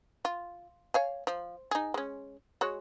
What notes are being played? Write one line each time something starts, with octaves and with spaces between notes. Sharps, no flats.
F4
C#5 F5 G#5
F3
D#4 G#4
G#3 C#4
G#3 F#4 C#5